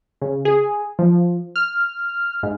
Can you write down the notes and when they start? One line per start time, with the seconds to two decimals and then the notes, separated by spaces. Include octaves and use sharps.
0.21 C#3
0.45 G#4
0.99 F3
1.56 F6
2.43 G#2